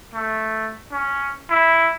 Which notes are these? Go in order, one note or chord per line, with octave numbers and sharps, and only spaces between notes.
A3
C#4
E4